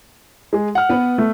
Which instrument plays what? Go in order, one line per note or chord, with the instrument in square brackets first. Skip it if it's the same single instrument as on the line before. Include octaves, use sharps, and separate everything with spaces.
[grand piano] G#3 G#4
F#5 F6
[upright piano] B3 B4
[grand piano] A3